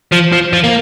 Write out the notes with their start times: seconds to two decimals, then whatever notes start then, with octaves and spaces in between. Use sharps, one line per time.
0.12 F3
0.33 F3
0.53 F3
0.64 A#3